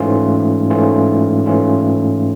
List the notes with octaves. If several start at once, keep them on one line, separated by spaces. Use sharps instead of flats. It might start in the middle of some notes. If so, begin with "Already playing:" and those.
Already playing: G#2 E3 A3 C#4 F4
G#2 E3 A3 C#4 F4
G#2 E3 A3 C#4 F4